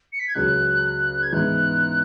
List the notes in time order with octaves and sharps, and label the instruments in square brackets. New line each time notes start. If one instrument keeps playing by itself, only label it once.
[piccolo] C#7
B6
G#6
[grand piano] C#2 C#3 F#3 [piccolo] F#6
[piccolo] G#6
[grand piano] G#2 E3 B3 E4 [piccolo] F#6